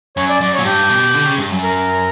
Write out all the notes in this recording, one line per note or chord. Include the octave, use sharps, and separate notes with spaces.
F#2 C#5
D5
F#2 D5
C#5
A#2
G2 G4
B2
D3
C#3
G2
F#2
A#4